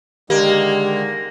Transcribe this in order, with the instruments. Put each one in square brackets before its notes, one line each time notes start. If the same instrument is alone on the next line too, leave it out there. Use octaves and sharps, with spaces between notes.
[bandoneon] D3 D#3 G#3 [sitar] A#3 [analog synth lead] G4